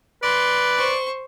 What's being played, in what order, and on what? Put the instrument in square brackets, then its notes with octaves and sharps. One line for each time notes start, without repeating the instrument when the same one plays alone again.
[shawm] B4 [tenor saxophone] D5 [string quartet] C6
[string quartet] C5 C#6